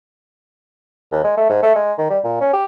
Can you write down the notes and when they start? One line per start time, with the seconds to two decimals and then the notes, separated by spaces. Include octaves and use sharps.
1.12 D#2
1.24 G#3
1.37 A3
1.49 G#2
1.62 A3
1.76 G#3
1.98 D#3
2.10 G3
2.24 A#2
2.41 C#4
2.53 G4